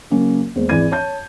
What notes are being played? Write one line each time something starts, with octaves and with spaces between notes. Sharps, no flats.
C#3 F#3 A#3 C#4
E2 G#3 A#3 C5
G#1 E3 G#4 D5 G#6 D#7
C#5 A5 G6